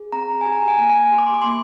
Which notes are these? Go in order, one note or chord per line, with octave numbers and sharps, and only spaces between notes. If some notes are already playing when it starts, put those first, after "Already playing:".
Already playing: G#4
C4 A#5
G#5
G4 A#5
G#5
A#3
G#5
G4 C6
D6
C6
D6
A#3 C6